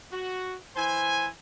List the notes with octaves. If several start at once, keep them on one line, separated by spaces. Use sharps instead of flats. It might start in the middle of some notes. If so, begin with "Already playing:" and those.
F#4
E3 C5 G#5